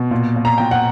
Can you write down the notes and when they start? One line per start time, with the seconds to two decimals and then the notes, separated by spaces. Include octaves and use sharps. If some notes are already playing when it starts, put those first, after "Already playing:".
Already playing: B2
0.11 A#2
0.36 A#2
0.45 A#5
0.58 A#2 G5
0.71 F#5